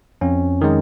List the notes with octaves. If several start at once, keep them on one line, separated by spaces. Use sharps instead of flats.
F2 C#4
D#3 G#3